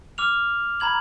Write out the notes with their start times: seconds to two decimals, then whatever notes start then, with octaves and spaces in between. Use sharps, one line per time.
0.18 D6 F6 F7
0.80 A#5 B5 G#6 F#7